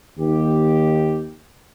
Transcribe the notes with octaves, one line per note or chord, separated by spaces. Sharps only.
D#2 G4